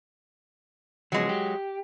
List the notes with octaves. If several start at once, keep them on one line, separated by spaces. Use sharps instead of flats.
C#3 F3 F#3 G#3 B3
G4